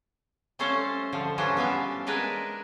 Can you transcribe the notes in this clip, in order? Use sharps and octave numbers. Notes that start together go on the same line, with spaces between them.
G3 A3 C#4 C5 F5 A5
D3 F3
E3 G3 C#4 D4 F4
B3 G4 E5 F5
G#3 D4 A#4 B4 G#5